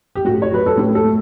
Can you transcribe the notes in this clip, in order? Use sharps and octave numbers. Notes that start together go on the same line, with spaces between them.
G4
A2 F#4
C#5
F#3 B4
A4
A2 G4
A4
A3